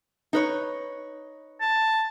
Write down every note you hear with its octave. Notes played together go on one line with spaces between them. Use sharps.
D#4 B4 C#5
A5